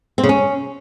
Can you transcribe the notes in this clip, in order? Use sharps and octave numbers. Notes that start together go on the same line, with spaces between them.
C4
C#3
C#4